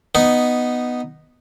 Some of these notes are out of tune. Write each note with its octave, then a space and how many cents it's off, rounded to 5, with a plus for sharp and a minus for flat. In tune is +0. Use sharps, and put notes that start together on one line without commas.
B3 +0 D#4 -5